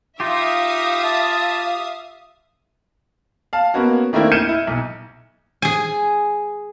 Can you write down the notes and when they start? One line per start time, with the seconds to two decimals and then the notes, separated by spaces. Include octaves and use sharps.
0.20 D#4 F4 G4 E5 F5 D#6
1.04 A5
3.53 F5 A5
3.74 A#3 B3 C#4 F#4
4.13 D#3 A3 A#3 C4 D4 E4
4.32 F6 G6 G#6 C#7 D#7 E7
4.49 E4
4.67 B1
5.62 G#4 G#5